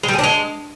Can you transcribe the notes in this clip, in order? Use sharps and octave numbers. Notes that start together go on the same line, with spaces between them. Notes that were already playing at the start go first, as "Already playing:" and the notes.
G#3
G3
G#4
D4
G#3